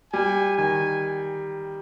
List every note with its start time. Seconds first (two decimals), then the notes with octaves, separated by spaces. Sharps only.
0.13 G3 G#5
0.57 D#3 G#5